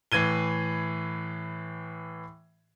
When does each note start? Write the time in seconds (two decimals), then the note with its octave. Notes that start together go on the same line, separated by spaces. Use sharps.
0.12 A2 E3 G#6 D#7 G7